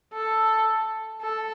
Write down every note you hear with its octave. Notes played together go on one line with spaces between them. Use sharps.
A4
A4